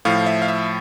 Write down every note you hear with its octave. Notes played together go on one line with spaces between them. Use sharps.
A2 F3 F5
E5
F5
E5